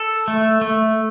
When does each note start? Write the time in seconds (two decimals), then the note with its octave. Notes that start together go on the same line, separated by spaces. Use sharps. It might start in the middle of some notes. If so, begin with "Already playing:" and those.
Already playing: A4
0.28 A3
0.61 A3